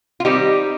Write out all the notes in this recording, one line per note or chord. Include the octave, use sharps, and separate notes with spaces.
F4
D#3 G3 C4 D#4 G4